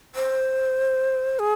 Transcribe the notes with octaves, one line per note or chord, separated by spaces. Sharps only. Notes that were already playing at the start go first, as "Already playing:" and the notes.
C5
G#4